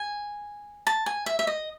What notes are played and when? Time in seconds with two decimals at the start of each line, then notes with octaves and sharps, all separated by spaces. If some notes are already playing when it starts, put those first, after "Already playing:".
Already playing: G#5
0.87 A5
1.06 G#5
1.26 E5
1.39 E5
1.47 D#5